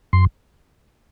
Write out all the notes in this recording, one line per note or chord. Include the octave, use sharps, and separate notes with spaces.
F#2 C6